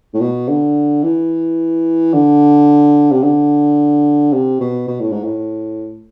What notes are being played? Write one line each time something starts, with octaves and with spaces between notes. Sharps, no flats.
A2
B2
D3
E3
D3
C3
D3
C3
B2
B2
A2
G#2
A2